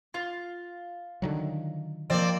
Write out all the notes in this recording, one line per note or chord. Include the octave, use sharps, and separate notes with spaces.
F4 C7
D3 D#3 F#3
F3 A#3 C4 D5